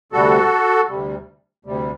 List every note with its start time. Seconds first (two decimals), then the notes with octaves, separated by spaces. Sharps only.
0.12 D2 C3 G3 F#4 A4
0.89 D2 C3 G3
1.65 D2 C3 G3